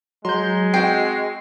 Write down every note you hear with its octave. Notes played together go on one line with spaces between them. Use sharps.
F#3 G#3 A#5 C6 G6
C4 F#4 G5 C7